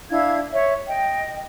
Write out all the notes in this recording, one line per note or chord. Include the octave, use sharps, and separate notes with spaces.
D4 E4 F5 G#6
C#5 E5
D#5 G5